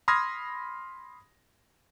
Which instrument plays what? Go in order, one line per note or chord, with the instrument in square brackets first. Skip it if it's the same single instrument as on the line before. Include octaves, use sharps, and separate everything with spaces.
[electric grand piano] B5 C6 D#6 F6 G#6 A#6